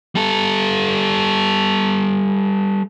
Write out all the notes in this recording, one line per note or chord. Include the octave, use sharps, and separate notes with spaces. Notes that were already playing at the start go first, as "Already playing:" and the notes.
G3 A4